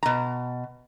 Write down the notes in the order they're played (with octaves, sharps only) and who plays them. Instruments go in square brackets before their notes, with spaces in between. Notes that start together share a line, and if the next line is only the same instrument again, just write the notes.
[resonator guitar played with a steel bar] B2 A#5